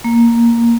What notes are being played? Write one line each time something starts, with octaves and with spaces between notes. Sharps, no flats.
A#3